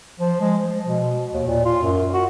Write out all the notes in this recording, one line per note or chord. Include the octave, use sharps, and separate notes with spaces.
F3
G#3
F3
B2
D#2
A#2
F4
F#2
F#4